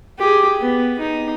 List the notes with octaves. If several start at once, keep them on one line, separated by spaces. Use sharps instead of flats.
G4 G#4
B3
D#4